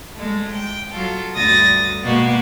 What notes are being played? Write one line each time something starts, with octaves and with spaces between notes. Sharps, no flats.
G#3 A3
G5
F#3 F4 A4
D2 G2 D#6 A6 A#6
B2 G#3 A#3 B3 F#4 G4